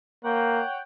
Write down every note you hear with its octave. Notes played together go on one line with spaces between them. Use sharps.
A#3 C#5 F#5 G5